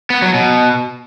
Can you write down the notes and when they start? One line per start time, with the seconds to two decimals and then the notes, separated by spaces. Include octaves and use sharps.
0.10 B3
0.22 F#3
0.34 B2